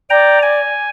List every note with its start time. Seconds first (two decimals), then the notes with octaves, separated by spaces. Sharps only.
0.10 D5 G5 A#5
0.43 G#5